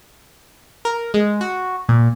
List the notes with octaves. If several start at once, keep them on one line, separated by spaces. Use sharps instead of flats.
A#4
G#3
F#4
A#2